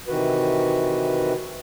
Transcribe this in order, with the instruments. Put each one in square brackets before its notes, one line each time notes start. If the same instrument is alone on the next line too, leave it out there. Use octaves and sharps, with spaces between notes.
[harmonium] C3 D#3 E3 F#4 B4